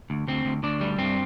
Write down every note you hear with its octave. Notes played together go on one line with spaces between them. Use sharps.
D2
D2 C4
D2
D2 D4
G3
G2 C4